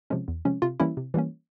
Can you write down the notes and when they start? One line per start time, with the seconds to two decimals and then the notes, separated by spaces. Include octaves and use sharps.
0.10 C3 F3 G#3 C#4
0.28 E2
0.45 C3 F3 G#3 C#4
0.62 C3 F4
0.80 E3 G3 A#3 C#4 E4
0.97 C3
1.14 E3 G3 A#3 C#4